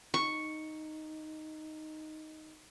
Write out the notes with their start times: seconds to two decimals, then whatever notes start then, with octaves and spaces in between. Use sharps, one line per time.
0.14 D#4 C#6